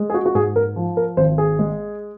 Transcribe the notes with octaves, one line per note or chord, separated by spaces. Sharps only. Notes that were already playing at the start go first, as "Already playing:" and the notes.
Already playing: G#3
G#4
F#4
F#4
G#2 G#4
A#4
F3
A#4
G#1 C5
G#4
G#3